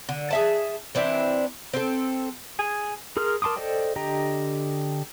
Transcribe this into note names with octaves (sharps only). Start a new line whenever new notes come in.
D3
G#4 E5 A5
E3 C4 D4 E4
C4 A4
G#4 G#5
G#4 A#4 C6 F6
A#4 A5 C6 D6 D#6
A4 C5 D5 D#5 G5
D3 G4 D#5 G5 A#5